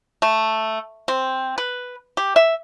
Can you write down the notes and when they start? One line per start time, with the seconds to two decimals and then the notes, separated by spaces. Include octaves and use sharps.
0.22 A3
1.08 C4
1.58 B4
2.17 G4
2.36 E5